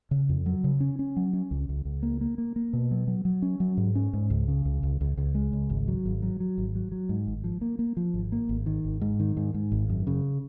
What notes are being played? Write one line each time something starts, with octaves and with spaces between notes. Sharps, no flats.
C#3
F2
F#3
C#3
C#4
C#4
F#3
C#4
C#2
C#2
C#2
A#3
A#3
A#3
A#3
B2
F#3
F#3
F#3
C#4
F#3
G#2
C#4
G#2
C#2
C#3
C#2
C#2
C#2
C#2
G#3
C#2
G#1
F#3
G#1
F#3
F#3
G#1
F#3
F#3
G#2
G#1
F3
A#3
A#3
F3
G#1
A#3
G#1
D#3
G#1
G#2
D#3
G#2
G#2
G#1
F#2
C#3